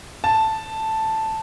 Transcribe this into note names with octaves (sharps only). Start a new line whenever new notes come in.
A5